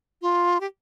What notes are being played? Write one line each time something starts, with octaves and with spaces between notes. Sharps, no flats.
F4
G4